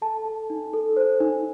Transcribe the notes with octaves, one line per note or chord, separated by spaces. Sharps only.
A4 A5
A4
D#4
A4
C5
D#4